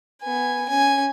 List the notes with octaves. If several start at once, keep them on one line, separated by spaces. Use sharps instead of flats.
B3 G#5
C#4 G#5